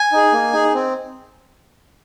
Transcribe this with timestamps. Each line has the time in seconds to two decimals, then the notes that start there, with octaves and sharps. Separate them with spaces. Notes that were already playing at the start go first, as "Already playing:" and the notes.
Already playing: G#5
0.13 D#4 G#4
0.33 A#3
0.53 D#4 G#4
0.73 C4